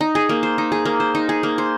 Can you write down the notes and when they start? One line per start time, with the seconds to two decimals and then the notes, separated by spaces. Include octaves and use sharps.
0.01 D#4
0.15 G#4
0.29 A#3
0.43 C5
0.58 D#4
0.72 G#4
0.85 A#3
1.00 C5
1.15 D#4
1.29 G#4
1.43 A#3
1.58 C5